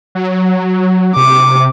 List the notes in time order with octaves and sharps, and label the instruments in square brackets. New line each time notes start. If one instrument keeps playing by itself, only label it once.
[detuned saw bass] F#3
[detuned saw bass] C3 [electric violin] D6